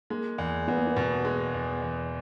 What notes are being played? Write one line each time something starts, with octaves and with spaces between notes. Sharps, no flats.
G#3 A#3
E2
E2 B3
A#3
B3
B2
G#3
E2
E2